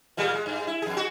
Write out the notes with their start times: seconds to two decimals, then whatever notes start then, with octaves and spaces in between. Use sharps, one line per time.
0.17 A#2 G3 G#3
0.34 G#3
0.46 G2
0.67 E4
0.82 F2 G#4
0.97 G#3 F#4